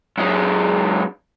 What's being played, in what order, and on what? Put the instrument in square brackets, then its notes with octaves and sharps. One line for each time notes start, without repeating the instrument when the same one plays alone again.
[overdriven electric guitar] F#2 G#3